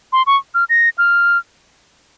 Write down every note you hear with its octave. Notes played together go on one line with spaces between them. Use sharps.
C6
C#6
F6
A#6
F6